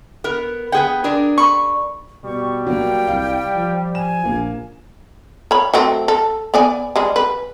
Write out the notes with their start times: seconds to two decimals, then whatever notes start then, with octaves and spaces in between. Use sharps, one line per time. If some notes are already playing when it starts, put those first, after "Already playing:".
0.24 B3 A#4
0.72 B3 G#4 F#5 G5
1.04 D4 G#4 A#4
1.38 B5 C#6
2.24 B2 G3 C#6
2.67 F#3 A#3 G5
3.08 C2 F5
3.55 F3
3.95 G#5 E7
4.25 A#1 A#3
5.51 C#5 B5
5.74 F#3 A3 C4
6.08 A4
6.54 B3 D5 G#5
6.96 G3 G#3
7.16 B4